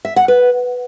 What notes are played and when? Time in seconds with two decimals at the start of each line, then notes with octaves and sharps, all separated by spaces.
0.05 E5
0.16 F#5
0.28 B4